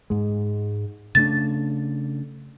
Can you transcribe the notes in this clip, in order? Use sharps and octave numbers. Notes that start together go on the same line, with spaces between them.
G#2 G#3
C#3 A3 D4 A6